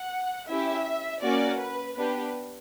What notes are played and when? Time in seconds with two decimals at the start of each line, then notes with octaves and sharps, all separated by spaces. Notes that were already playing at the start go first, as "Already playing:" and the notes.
Already playing: F#5
0.48 C#4 E4 G4 E5
1.22 A#3 C#4 F#4 D5
1.60 B4
1.96 B3 D4 G4 B4